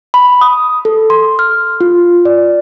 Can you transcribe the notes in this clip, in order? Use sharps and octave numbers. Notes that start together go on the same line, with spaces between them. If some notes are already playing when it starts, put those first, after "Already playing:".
B5
D#6
A4
C6
F6
F4
D5